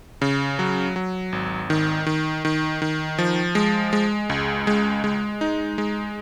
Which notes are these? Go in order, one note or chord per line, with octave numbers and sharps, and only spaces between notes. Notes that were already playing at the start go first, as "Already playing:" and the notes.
C#3
F#3
F#3
G#1
D#3
D#3
D#3
D#3
F3
G#3
G#3
C#2
G#3
G#3
D#4
G#3